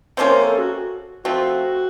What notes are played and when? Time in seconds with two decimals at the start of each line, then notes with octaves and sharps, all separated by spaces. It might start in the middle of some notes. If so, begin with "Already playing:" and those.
0.17 C3 F3 A#3 C#4 C5
0.31 A#4
0.44 A4
0.58 F#4
1.25 F3 A3 C4 F#4